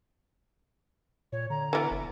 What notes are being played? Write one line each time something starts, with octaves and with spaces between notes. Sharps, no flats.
A#2 C#5
D3 A#5
E3 B3
F#1